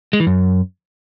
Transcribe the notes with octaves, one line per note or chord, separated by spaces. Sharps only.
G#3
E3
F#2